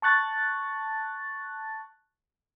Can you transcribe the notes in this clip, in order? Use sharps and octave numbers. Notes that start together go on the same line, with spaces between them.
A5 C#6 F#6 A6